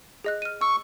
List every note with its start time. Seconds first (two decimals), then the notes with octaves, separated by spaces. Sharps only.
0.24 G#4 D#5 F#6
0.42 F6 D#7
0.61 C#6 E6